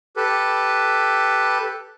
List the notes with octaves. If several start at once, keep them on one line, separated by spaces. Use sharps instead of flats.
G4 A4 B4